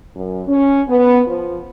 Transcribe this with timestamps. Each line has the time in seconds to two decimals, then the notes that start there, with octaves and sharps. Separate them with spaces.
0.15 F#2
0.48 C#4
0.88 B3
1.26 F3